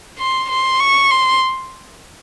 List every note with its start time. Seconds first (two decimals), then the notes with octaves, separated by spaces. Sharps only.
0.19 C6
0.49 C6
0.80 C#6
1.10 C6